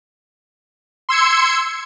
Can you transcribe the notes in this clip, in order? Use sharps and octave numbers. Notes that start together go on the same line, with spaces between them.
C6 E6 G#6 C#7